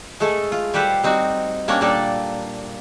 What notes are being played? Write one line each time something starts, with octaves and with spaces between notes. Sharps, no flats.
G#3 A3 G#4 A4
F4
G3 G4 A4 B4 C5
G3 C4 D#4 F#4
G3 A#3 C#4 D4 A#4 C#5
A#2 G3 A#3 D4 A4 D5